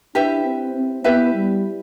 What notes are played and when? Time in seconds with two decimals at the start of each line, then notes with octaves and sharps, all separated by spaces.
0.15 D4 E4 G4 B4 E5
0.44 C4
0.74 C4
1.04 B3 E4 G4 B4 E5
1.33 G3